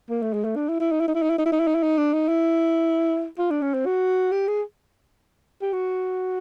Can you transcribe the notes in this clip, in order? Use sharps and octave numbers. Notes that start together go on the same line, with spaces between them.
A#3
A3
G#3
A3
D4
E4
E4
D#4
E4
D#4
E4
D#4
E4
D#4
E4
D#4
E4
D#4
E4
D#4
D4
D#4
E4
F4
D4
C#4
C4
F#4
G4
G#4
G4
F#4